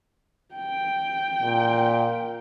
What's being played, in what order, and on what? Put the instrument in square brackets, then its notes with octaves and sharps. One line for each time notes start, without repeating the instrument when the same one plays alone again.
[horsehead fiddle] G5
[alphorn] A#2